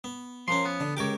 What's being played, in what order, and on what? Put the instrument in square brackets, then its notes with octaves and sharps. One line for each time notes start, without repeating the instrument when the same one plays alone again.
[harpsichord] B3
[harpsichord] F3 C#4 [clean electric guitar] A#4 C6
[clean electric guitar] B3
[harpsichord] D3
[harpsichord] C#2 A#4 D6 [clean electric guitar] G4 C#5